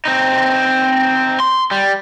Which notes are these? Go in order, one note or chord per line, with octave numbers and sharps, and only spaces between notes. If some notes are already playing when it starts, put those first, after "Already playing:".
C4 D#4
C6
G3